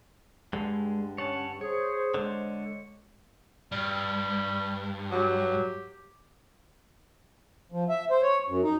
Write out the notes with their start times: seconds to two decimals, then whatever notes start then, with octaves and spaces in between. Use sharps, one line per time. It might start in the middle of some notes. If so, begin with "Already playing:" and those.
0.53 G2 D3 G#3
1.18 C#4 C#5 F#5 A5
1.61 G#4 C5 C#5
2.14 D3 G#3
3.72 G2 G3
5.11 F#3 G4
7.72 F3
7.89 E5
8.11 C5
8.22 C#5
8.48 F#2
8.64 D#4